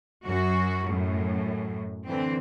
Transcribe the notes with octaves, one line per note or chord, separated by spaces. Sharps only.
F#2 F#4
F#2 A2
D3 E3 C4